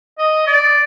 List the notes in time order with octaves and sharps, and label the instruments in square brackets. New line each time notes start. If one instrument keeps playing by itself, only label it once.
[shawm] D#5
D5